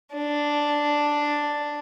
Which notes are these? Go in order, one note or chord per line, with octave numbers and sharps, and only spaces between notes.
D4